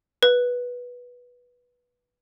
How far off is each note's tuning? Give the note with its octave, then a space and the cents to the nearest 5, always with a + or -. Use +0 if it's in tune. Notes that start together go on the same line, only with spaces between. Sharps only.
B4 -10